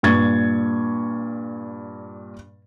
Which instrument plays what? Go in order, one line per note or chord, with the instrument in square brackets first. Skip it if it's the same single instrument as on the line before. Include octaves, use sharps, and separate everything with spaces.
[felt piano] G2 A#2 C#6 G#6 A6